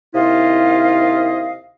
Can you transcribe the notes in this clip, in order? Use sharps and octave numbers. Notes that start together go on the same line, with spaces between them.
D#2 C3 E4 F4 D#5 F5